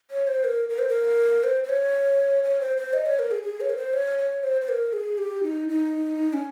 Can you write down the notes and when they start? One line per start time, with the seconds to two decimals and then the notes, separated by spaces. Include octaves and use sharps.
0.11 C#5
0.27 C5
0.44 A#4
0.69 A#4
0.79 C5
0.88 A#4
1.44 C5
1.64 C5
1.69 C#5
2.44 C#5
2.60 C5
2.77 C5
2.93 D#5
3.06 C#5
3.19 A#4
3.31 G#4
3.43 G#4
3.61 C#5
3.70 A#4
3.77 C5
3.93 C#5
4.19 C#5
4.43 C5
4.61 C5
4.69 A#4
4.93 G#4
5.18 G4
5.43 D#4
5.69 D#4
6.33 C#4